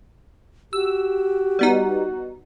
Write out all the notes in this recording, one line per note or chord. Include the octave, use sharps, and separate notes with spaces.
F#4 G4 E6
G3 B3 D#4